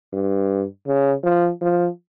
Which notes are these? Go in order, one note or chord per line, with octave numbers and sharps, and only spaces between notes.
G2
C#3
F3
F3